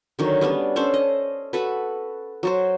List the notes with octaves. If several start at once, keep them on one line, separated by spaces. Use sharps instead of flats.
D3 D#3 F#3
G3 B3 C#4 D4
C#4 D4 A4 C5
D#5
F#4 A4 B4
F#3 F#4 C5